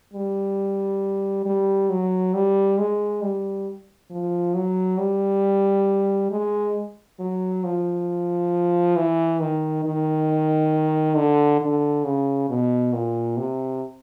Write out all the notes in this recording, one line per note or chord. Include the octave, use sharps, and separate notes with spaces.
G3
G3
F#3
G3
G#3
G3
F3
F#3
G3
G#3
F#3
F3
E3
D#3
D#3
D3
D3
C#3
B2
A#2
C3